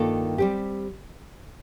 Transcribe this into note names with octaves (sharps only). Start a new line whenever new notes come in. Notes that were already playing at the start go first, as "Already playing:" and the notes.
Already playing: G2 D#3 A#3 F4 A4
G3 C4 G4